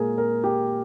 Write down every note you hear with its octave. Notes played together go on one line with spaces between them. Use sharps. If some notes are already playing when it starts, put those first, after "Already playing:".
Already playing: A#2 G#3 G#4 A#4
A#4
G4